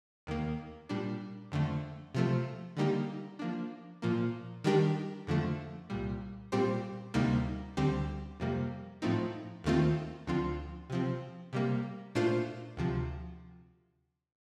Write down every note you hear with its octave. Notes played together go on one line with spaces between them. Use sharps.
D#2 D#3 A#3
A#2 G3 D4
F2 D3 A3
C3 F3 A3
D3 G3 A#3 D#4 G4
F3 A#3 D4
A#2 F3 A#3
D#3 G3 D4 G4 A#4
F2 D3 F3 A3
C2 A#2 G3
A#2 G3 C4 G4 C5
D2 C3 G3 A#3 D#4
D2 D3 G3 C4 G4
F2 C3 G3 A#3
A2 F3 A3 C4 D#4
D#2 D#3 A3 C4 F4
D2 D3 F3 C4 F4
C3 F3 C4
C3 G3 A#3
A#2 A3 D4 F4 C5
D2 C3 F3